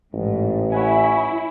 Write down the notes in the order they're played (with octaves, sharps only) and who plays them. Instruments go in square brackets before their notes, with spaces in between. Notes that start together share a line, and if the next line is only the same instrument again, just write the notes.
[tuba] A1 [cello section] G#2
[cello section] E4 [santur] C#5 F#5 G#5